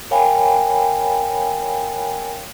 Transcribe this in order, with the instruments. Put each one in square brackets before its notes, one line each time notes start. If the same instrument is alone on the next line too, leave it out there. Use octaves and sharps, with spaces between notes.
[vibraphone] A#4 C#5 F5 G5 G#5 B5